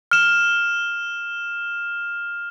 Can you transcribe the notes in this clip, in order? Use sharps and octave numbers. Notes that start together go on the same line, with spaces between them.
F6 E7